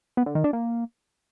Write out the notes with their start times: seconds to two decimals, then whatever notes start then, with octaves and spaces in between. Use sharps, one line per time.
0.17 B3
0.26 D3
0.35 D#3
0.44 D4
0.53 A#3